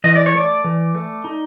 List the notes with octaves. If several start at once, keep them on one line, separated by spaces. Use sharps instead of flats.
E3 D#5
D5
C#5
A3 D5
E3
A3
D#4